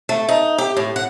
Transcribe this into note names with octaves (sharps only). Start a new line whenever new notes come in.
A3
D#4
G4
A2
F#5